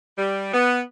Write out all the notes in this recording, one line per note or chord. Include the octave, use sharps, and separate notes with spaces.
G3
B3